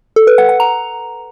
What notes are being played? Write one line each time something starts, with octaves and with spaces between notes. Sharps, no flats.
A4
B4
F#5
F#5
A#5